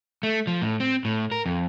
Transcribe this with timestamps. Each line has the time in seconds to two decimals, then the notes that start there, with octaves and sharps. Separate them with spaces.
0.23 A3
0.47 F3
0.62 A2
0.80 C4
1.05 A2
1.32 A#4
1.46 F2